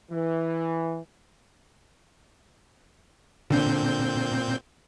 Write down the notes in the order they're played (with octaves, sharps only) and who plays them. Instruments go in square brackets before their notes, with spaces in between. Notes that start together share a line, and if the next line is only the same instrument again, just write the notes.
[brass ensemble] E3
[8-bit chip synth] A#2 C4 G6 [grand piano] D3